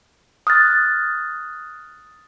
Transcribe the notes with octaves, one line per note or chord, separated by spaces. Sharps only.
D#6 F6 F#6 A6